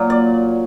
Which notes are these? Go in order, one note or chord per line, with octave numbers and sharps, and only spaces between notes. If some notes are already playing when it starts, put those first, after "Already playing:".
Already playing: A#2 F#3
D5